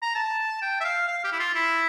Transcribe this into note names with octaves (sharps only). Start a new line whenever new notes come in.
A#5
A5
G5
E5
F5
F5
G4
E4
F4
E4